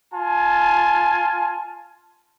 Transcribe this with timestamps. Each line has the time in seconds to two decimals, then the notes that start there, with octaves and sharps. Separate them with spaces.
0.13 F4 G#5 A5